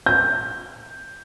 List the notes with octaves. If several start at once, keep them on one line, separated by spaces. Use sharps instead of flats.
G6